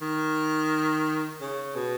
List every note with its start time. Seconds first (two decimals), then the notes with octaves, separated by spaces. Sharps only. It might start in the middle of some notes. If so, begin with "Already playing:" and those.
0.01 D#3
1.41 C#3
1.76 B2